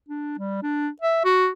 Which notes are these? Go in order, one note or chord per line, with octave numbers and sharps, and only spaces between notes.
D4
G3
D4
E5
F#4